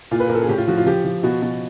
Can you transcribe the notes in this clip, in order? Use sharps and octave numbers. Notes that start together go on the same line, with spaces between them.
A#2 F4
B4
A#2 A#4
A4
G#4
A2 G4
F4
F3 F#4
F4
F3 G4
F3
B2 F#4
B2